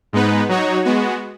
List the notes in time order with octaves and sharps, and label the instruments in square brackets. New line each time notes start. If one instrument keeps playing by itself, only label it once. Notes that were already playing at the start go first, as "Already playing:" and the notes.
[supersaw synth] G#2 G#3 B3 D#4 B4
F#3 D#4 F#4 C#5
G#3 B3 F#4